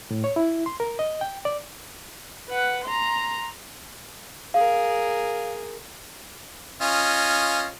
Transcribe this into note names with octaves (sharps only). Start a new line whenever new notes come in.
A2
C#5
E4
C6
A#4
D#5
G5
D5
B4 F#5
A#5 C6
G#4 A#4 F5
C#4 F4 D#5